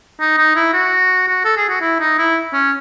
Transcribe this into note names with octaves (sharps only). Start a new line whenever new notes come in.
D#4
D#4
E4
F#4
F#4
A4
G#4
F#4
E4
D#4
E4
C#4